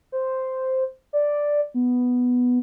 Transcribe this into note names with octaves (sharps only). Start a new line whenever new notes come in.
C5
D5
B3